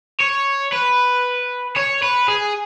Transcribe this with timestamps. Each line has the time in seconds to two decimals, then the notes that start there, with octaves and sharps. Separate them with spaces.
0.20 C#5
0.72 B4
1.76 C#5
2.02 B4
2.28 G#4